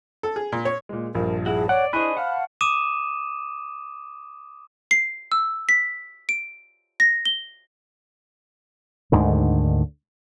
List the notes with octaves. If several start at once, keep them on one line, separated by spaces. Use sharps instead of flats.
A4
G#4
A#2
C#5
A#2 G#3
A#1 G2 F3 A#4
E4 F#4 G#4
C#5 D5 F#5
D4 E4 G#4 C5 D#5 B5 C#6 F#6
F5 F#5 A5 F6
D6 D#6 D#7 E7
C7
E6
B6
D7
A#6
G7
D2 G#2 D3 D#3